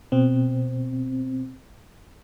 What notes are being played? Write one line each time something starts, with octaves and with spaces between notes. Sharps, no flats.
B2 C4